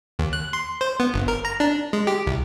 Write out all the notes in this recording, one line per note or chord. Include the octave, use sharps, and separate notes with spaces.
D#2
F#6
C6
C5
B3
G1
A#4
A#5
D4
G#3
G4
C2